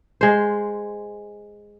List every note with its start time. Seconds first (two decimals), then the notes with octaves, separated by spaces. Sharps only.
0.21 G#3 C5